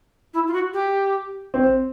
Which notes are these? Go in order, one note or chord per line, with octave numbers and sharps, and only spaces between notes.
E4
F4
F#4
G4
C4